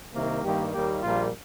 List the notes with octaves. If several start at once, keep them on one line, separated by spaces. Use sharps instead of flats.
C2 C3 D#3 A#3
G2 D#3 G3 A#3 G4
D#2 D#3 G3 A#3 G4
A#1 A#2 G3 A#3 F4